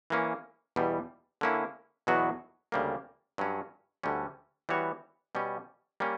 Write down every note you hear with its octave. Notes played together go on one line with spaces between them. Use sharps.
E3 A#3 C#4
E2 B2 G3
D3 A#3 C#4 E4
E2 B2 F#3 B3 F#4
D2 C#3 G3 A#3
G2 F#3 C#4
D2 D3 G3 C#4
E3 G3 B3 F#4 C#5
B2 G3 C#4
G3 A#3 C#4